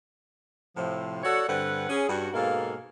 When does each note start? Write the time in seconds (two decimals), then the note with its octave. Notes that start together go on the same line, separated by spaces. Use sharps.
0.77 A2 C3 F3
1.24 F#4 A4 C#5 D5 F#5
1.49 G2 D3 C4 B4 F#5
1.90 C#4 G#4
2.09 G2 G3 F#4
2.34 G#2 B2 A#3 A4 F5